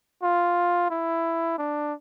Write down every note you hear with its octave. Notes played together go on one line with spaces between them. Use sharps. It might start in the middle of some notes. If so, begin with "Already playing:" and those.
F4
E4
D4